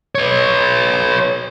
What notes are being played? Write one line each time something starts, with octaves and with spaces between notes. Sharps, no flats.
B4 C#5